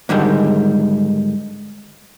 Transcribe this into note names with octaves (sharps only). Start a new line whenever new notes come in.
G#2 D3 D#3 G3 G#3